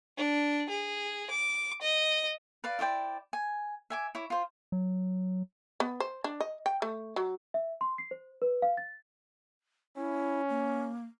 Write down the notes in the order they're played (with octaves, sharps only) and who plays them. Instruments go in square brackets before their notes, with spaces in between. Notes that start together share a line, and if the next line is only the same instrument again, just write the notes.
[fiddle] D4
G#4
D6
D#5
[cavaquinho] B4 D5 F5
E4 C5 D5 G5
G#5
E5 G#5 D6
E4 C#5 D6
F4 C5
[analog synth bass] F#3
[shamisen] B3
C5
D4
D#5
G5
A3
F#3
[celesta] E5
C6
C7
C5
B4
F5
A6
[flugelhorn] C#4 [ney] E4
[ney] A#3